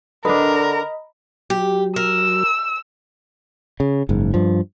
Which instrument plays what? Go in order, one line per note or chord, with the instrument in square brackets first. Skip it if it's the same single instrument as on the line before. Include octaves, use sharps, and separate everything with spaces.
[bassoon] D3 [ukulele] D4 B4 [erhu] A#4 [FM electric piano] D#5 B5
[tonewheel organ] F#3 [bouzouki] G4
[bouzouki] A#4 [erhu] E6
[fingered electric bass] C#3
F#1 G#2
G2 F3